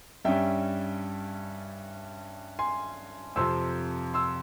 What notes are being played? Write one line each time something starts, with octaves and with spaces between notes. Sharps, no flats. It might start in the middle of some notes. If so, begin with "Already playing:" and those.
G2 G3 C#4 E5 G5
G#5 C6
F2 C3 F3 C6 E6
C6 E6